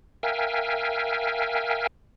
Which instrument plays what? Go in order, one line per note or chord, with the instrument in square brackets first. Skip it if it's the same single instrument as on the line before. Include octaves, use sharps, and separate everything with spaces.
[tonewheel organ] A#4 E5 F5 G5 G#5